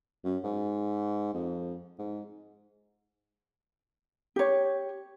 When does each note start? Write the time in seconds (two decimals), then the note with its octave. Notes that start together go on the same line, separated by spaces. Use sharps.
0.24 F#2
0.44 G#2
1.34 F2
1.99 G#2
4.36 G4 C#5